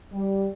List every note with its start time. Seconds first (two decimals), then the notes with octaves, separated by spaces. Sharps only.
0.12 G3